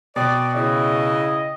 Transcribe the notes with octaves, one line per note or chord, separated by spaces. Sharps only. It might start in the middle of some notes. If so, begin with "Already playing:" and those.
B2 D5 G5 D#6 A6
C#3 E4 D#5